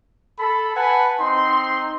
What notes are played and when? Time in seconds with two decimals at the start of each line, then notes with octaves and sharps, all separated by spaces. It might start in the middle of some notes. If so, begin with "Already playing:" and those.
0.39 A4 B5
0.75 B4 F#5 G#5 A5 B5
1.19 C4 D#4 C6